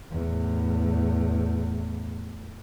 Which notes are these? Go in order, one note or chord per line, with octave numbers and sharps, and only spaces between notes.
E2 A2